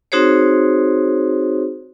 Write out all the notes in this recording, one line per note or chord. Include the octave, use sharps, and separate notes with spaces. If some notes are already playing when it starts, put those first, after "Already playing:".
C4 D#4 F#4 G#4 C5 C#5